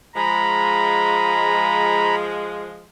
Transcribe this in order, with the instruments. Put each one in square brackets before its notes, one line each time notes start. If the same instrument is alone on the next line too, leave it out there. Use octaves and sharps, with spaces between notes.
[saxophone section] F3 G#3 [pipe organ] A#5 B5